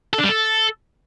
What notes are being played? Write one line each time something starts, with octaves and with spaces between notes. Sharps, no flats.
A4
D4
G3
A4